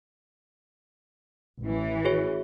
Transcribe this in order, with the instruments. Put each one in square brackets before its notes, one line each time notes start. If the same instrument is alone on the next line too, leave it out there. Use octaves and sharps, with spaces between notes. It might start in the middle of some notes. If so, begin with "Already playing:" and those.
[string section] A1 E3
[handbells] F#4 G#4 C#5